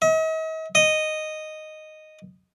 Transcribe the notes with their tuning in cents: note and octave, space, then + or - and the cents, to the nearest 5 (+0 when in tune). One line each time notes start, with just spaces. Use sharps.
D#5 +45
D#5 -5